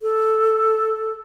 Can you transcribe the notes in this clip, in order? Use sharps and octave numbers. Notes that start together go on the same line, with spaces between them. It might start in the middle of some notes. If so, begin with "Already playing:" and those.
A4